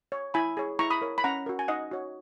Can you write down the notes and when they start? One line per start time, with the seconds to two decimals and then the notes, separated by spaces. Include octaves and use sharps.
0.12 C#5
0.34 E4 G#5 B5
0.57 G#4 C#5
0.79 E4 A#5 C#6
0.90 B5 D#6
1.02 A#4 C#5
1.18 B5
1.24 C#4 F#5 A#5
1.46 F#4 A#4
1.59 G#5
1.68 D#4 D#5 F#5
1.91 F#4 C#5